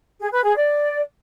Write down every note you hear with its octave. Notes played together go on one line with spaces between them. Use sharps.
G#4
B4
G#4
D5